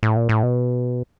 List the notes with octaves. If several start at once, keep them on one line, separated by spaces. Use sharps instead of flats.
A2
A#2
A2
B2